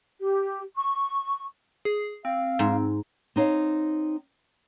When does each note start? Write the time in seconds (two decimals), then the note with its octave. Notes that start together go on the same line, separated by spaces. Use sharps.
0.21 G4
0.77 C#6
1.85 G#4
2.25 C4 F5
2.59 G#2
3.36 C4 D#4 C#5 F5